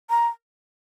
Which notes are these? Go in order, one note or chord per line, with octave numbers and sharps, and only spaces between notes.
A#5